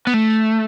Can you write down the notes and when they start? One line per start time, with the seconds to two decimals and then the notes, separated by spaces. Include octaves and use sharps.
0.07 B3
0.14 A3